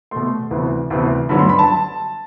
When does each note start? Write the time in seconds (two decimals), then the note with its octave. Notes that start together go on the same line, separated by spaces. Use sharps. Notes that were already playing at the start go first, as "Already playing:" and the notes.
0.11 B2 A3 C6
0.51 D2 C3 E3 B3
0.90 D2 C3 E3 B3
1.29 G2 D3 F#3 B3 B5
1.39 C6
1.49 B5
1.59 A5